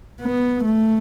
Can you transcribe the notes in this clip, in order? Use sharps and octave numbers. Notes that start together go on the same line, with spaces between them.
B3
A3